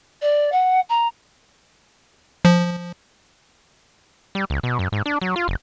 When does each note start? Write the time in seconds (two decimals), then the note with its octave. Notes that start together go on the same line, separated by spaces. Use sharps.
0.21 D5
0.51 F#5
0.89 A#5
2.45 F3
4.35 G3
4.50 C#2
4.63 B2
4.79 F#2
4.92 G#2
5.06 D4
5.22 F#3
5.36 F4
5.48 F#1